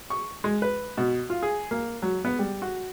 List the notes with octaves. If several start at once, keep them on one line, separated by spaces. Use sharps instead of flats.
C#6
G#3
B4
B2
F4
G#4
A#3
F#3
B3
G3
F#4